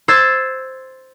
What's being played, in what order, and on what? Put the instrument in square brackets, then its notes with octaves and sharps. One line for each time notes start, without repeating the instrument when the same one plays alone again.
[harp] C5 E6 G#6 A6